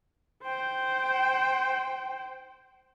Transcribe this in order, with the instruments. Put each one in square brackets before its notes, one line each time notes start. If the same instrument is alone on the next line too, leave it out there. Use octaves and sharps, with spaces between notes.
[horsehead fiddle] C5 G5